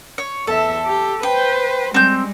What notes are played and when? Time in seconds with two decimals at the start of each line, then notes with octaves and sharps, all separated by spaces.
0.18 C#5
0.47 E2 A4 E5
0.86 G4
1.23 B4 C5 G5
1.94 G3 G#3 C4 G6